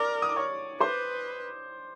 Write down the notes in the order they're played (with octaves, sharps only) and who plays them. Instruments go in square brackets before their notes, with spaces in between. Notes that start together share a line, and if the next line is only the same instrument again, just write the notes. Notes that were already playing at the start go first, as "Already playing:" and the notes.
Already playing: [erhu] A#4 [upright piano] D5 D6
[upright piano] D#6
D6
C#5 C#6
[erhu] B4 [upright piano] C5 C6